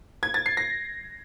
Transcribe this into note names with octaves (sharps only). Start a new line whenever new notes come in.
G#6
A6
C7
A#6